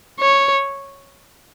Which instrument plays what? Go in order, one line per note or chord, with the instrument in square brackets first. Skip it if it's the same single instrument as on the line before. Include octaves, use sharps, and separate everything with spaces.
[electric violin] C#5